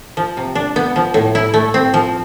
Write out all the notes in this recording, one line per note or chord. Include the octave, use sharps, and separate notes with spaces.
F3
C3
D4
B3
F3
A2
E4
A3
C4
F3